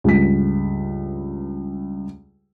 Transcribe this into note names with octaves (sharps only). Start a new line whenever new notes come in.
C#2 G2 B6